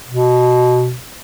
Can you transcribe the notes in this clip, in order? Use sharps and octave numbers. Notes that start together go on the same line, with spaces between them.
B2